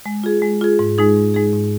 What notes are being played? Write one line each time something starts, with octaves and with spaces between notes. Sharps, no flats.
G#3
F4 G#4
G#3
F4 G#4
G#2
G#3 D#4 G#4
G#2
G#3 D#4 G#4
G#2